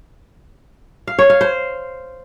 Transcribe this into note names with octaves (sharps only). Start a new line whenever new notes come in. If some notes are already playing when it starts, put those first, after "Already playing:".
F5
C#5
F5
C5